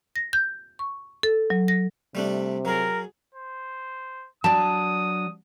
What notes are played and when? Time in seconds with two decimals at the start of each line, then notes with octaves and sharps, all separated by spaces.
0.16 A#6
0.33 G6
0.79 C#6
1.23 A4
1.50 F#3
1.68 A#6
2.15 C3 G3 A3 D4
2.65 F#3 G#4 A#4
3.35 C5
4.44 F#3 D4 D5 A5 D#6